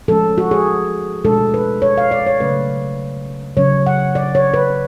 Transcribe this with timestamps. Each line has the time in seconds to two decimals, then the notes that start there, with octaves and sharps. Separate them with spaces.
0.08 F3 G#3 C#4 A4
0.38 F#4
0.51 G#4
1.24 B2 G#3 D4 A4
1.54 B4
1.82 C#5
1.98 F5
2.11 D5
2.26 C#5
2.40 C#3 F#3 A3 C#4 B4
3.57 C#3 F#3 C#4 C#5
3.86 F#5
4.15 D5
4.35 C#5
4.54 B4